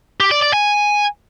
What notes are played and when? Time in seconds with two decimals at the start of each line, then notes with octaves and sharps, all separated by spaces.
0.20 G4
0.31 D5
0.42 D5
0.53 G#5